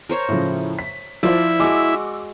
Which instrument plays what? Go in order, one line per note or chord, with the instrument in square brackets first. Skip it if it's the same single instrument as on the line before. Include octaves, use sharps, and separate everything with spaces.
[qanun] A#4 C5 C#5
[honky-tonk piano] A2 C#3 F3
B6
[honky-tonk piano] F3 F4 C5 [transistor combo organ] E4 [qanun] D5
[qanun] G#3 F#4 [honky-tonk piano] D6 E6